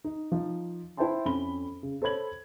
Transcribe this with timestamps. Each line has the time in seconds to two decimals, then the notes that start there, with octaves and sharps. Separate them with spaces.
0.04 D#4
0.32 F3 D#4
0.97 E4 C5 E5 G5 A5 C6
1.25 F2 C#4 B5 G7
1.83 C#3
2.02 A4 C5 C#5 B5 G#6 F#7